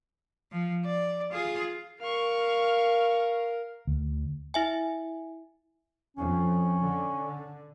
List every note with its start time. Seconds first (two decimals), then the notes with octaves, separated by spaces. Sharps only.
0.52 F3
0.85 D5
1.32 F4 G#4
2.01 A#4 F5 C#6 F6
3.87 D2
4.54 E4 E5 G#5
6.16 F2 C#4
6.84 D3